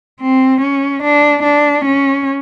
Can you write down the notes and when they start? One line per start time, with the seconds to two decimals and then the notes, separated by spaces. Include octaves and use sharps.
0.21 C4
0.61 C#4
1.03 D4
1.43 D4
1.85 C#4